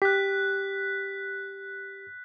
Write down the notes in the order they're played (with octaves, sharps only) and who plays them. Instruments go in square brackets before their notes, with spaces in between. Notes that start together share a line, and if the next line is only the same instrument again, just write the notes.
[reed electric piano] G4 [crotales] F#6 B6